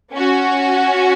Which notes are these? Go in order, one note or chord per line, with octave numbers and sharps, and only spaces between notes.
C#4 F#4